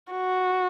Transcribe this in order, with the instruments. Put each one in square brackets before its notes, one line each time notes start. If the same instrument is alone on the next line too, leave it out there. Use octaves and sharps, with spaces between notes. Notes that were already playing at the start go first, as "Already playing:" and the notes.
[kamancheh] F#4